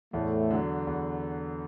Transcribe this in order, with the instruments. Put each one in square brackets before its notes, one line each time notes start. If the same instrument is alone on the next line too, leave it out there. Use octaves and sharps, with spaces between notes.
[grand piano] E2 [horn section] A2 A3
[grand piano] D3 F#3
E2